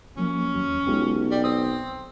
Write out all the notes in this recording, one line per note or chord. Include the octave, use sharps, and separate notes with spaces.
F3 F#3 A#3 C#4
D#2 F#3
B1 G#3 F4 G4
G3
C4 D#6